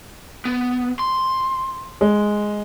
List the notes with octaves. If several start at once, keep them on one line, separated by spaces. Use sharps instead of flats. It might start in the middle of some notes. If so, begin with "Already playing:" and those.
B3
C6
G#3